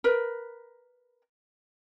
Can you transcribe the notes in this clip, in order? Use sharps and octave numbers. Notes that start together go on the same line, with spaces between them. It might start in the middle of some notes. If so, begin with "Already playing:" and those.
A#4 B4